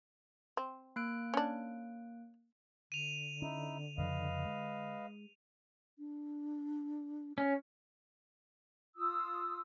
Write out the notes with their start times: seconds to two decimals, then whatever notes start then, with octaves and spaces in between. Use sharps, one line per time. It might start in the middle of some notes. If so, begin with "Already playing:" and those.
0.57 C4
0.96 A#3 F#6 D7
1.34 C#4 D4
2.92 D3 D#7 F7
3.42 C#4 D#4 E4
3.98 F2 C#3 F3 B4 D#5 F5
4.45 G#3
5.99 D4
7.38 C#4 C#5
8.96 F4 D#6 E6